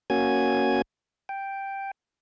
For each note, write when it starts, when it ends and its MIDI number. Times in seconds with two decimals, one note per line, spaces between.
0.10 0.82 58
0.10 0.82 61
0.10 0.82 66
0.10 0.82 80
0.10 0.82 92
1.29 1.91 79